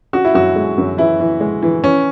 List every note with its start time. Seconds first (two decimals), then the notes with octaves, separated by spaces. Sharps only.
0.13 C#4 F#4
0.25 E4
0.34 F#2 F#4
0.56 G#3
0.78 F#2
0.98 E3 E4
1.20 E3
1.40 G#3
1.62 E3
1.83 E3 C#4